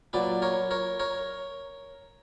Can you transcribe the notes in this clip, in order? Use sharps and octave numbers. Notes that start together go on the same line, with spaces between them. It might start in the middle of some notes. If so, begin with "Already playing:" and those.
A#2 F#3 B4 D5
A#4 C#5
A#4 C#5
A#4 C#5